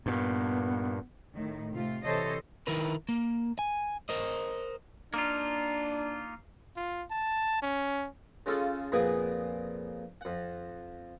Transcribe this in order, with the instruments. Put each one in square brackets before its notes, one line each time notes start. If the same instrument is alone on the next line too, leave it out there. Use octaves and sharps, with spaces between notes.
[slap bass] G2 A#2 [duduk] B3
[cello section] A2 D#3
C3 A3 F4
C3 E3 A4 C5 C#5 D#5
[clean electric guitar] D#3 E4 A#4 B4
A#3
G#5
A#4 C5 D#5
[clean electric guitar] A#3 D#4 F4 [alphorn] D4
[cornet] F4
A5
C#4
[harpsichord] C#3 G#3 C#4 F4 A4
F2 A#2 A#3 B3 G#4 F#5
F2 F#5